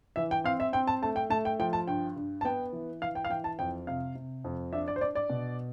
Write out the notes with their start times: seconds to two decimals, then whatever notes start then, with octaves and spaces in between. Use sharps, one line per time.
0.16 E3 E5
0.31 G5
0.44 C4 F5
0.60 E5
0.73 C4 G5
0.87 A5
1.02 A3 A5
1.16 G5
1.30 A3 A5
1.45 G5
1.59 F3 G5
1.73 A5
1.88 G2 G5
2.16 G2
2.41 A5
2.45 B3 G5
2.73 E3
3.02 E3 F5
3.15 G5
3.25 F5
3.30 E3 G5
3.44 A5
3.59 F2 G5
3.87 C3 F5
4.15 C3
4.44 F2
4.73 D4 E5
4.88 D5
4.96 C5
5.01 D4 D5
5.15 D5
5.30 B2